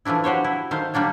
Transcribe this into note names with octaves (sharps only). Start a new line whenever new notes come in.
E3 F3 A3 D4 E4
F#4 G4 C5 C#5
E4
D#3 A3 C5 F5
G3 A#3 D4 C#5